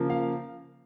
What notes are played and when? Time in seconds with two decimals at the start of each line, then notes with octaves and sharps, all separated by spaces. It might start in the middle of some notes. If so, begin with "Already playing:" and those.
Already playing: C#3 F3 A#3
0.10 F5